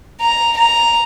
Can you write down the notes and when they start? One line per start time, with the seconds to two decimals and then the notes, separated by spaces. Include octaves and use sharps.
0.21 A#5
0.58 A#5